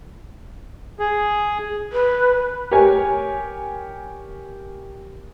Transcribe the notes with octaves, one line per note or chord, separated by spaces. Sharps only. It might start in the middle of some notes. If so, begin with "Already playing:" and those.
G#4
B4
G4 A#4 C#5 G#5